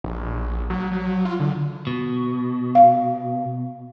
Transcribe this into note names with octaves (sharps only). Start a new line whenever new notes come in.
A#1
F#3
F#3
F4
D3
B2
F5